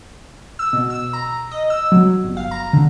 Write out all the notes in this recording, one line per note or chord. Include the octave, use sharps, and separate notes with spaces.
E6
B2
E6
A#5
D#5
E6
F#3
G1
F5
A#5
D3